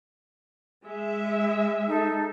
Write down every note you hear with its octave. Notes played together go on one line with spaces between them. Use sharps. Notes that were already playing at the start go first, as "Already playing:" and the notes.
G#3 E5
D#4 A4